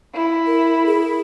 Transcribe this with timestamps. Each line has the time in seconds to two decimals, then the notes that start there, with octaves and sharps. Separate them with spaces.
0.14 E4
0.47 A#4
0.86 G#4